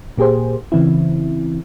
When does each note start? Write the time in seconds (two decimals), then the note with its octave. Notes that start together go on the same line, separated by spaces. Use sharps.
0.18 A#2 A#3 G4 G#4 C5
0.72 C#3 E3 C4 E4